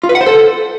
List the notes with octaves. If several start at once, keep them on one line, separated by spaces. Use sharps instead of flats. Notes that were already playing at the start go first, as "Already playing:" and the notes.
F4
B4
F#5
C5
A4